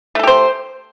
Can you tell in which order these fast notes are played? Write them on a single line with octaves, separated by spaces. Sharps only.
A3 A4 G4 C5